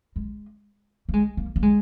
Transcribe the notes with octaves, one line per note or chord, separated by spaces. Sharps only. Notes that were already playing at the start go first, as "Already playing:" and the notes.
G#3
A#3
G#3
A#3
A#3
G#3